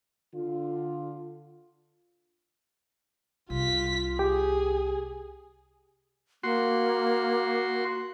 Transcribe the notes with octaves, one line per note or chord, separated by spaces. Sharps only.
D3 F4
C2 F4 B6
G4 G#4
A#3 F#4 C6